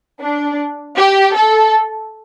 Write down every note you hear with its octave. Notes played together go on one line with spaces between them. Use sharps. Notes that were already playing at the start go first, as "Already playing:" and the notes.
D4
G4
A4